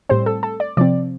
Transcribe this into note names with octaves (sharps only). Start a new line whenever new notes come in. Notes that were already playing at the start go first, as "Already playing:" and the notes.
A2 G3 C4 C5
A4
A4
D5
C3 F3 C4 D5